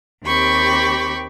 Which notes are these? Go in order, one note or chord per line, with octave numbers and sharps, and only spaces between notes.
D#2 C4 G4 B5 C#6